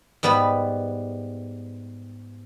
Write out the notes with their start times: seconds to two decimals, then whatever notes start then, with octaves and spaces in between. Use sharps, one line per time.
0.23 G#2 G3 B3 B4 B5